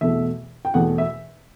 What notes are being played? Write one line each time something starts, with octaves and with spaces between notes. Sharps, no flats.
E2 B2 A3 E5
G5
E2 B2 A3 F#5
E5